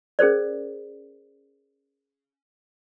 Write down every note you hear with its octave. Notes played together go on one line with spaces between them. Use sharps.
C#4 G#4 A#4 C5 D5